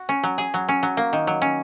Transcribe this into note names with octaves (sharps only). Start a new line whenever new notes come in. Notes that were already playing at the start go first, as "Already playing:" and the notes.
Already playing: F#4
C#4
F#3
G#4
F#3
C#4
F#3
A#3
D#3
F#3
C#4